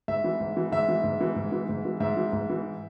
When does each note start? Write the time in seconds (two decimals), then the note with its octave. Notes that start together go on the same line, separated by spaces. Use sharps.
0.08 G#2 E5
0.24 E3
0.40 G#2
0.57 E3
0.72 G#2 E5
0.88 E3
1.04 G#2
1.21 E3
1.36 G#2
1.52 E3
1.69 G#2
1.85 E3
2.00 G#2 E5
2.17 E3
2.33 G#2
2.50 E3